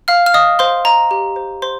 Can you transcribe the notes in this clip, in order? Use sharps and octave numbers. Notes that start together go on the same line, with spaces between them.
F5 F6
F6
D#5 F5 D#6
C5 F5 C6
D#5 A#5
G4
C5
C5 C6